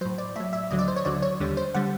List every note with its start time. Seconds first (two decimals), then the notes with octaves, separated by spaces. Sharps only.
0.01 A2 F#3 C5
0.18 D5
0.36 A2 F#3 E5
0.53 E5
0.71 D2 D3 F#3 D#5
0.79 D5
0.88 C5
0.96 C#5
1.05 D2 D3 F#3 D5
1.22 C#5
1.40 D#2 D3 G3
1.57 C5
1.74 D3 G3 F#5